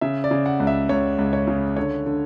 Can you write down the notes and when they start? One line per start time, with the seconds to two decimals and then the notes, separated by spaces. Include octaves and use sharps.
0.01 C#3 E5
0.24 D5
0.31 C#3
0.46 F#5
0.60 C#2
0.67 E5
0.89 C#2 C#5
1.18 C#2
1.33 C#5
1.48 C#3
1.77 D3 C#5
2.06 D3